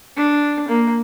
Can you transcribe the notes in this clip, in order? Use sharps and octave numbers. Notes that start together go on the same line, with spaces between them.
D4
A#3